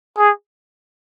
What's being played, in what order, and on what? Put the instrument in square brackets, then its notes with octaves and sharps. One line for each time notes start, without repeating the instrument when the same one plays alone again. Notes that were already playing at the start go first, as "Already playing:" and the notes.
[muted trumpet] G#4